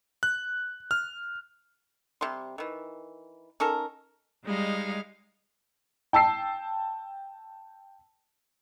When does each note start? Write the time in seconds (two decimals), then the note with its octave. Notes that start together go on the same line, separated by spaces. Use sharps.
0.23 F#6
0.91 F6
2.21 C3 G3 C6
2.58 D#3 E3
3.60 C#4 D#4 A4 A#4
4.44 G3 G#3 D#4 F5
6.13 G5 A5 E6 C7